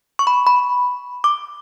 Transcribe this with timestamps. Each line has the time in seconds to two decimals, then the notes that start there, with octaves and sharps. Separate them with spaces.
0.19 C#6
0.27 B5
0.47 B5
1.24 D6